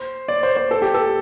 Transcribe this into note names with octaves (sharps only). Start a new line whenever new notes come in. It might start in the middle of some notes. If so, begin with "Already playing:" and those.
Already playing: C5
D5
C5
C5
A4
G4
A4